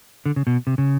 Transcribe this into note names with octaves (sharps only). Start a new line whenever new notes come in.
D3
C#3
B2
C3
C#3